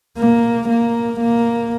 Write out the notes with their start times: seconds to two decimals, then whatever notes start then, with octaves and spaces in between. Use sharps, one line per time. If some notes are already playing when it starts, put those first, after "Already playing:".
0.18 A#3
0.68 A#3
1.20 A#3